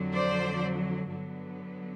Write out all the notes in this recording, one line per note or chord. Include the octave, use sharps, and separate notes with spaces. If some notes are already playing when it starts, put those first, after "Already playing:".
Already playing: F2 D3 F#3
C5 D5
G2 D3 F#3 B3